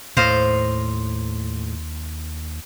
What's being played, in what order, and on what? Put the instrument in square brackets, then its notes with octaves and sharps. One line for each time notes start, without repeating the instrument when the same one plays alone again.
[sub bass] D#2 [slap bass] A2 [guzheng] C5 D#5 F5